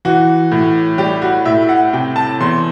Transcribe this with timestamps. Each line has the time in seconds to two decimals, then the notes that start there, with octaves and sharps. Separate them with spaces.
0.05 E3 F#4
0.52 A2
0.98 G3 G4
1.22 F#4
1.45 A2 E5
1.69 F#5
1.93 C3 G5
2.16 A5
2.40 E2 C6